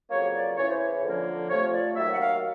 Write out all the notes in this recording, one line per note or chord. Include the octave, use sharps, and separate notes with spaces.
F2 C#3 F#3 A#3 C#5
D5
E2 C#3 E3 C#5
C5
C#5
F2 D3 F3 A#3
F2 C3 F3 A3 C#5
D5
D#2 D#3 F#3 A#3 E5
F#5
F5